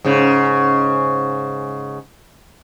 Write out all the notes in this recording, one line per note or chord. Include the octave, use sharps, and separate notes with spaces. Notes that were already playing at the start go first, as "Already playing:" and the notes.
G#2 C#3